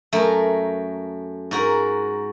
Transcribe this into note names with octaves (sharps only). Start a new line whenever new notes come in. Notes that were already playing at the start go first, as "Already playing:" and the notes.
F#2 A3 A#4
G#2 F#4 A#4